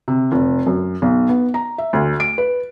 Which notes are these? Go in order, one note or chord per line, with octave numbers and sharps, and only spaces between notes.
C3
F1
F#2
B1
B3
A#5
E5
D2
D7
B4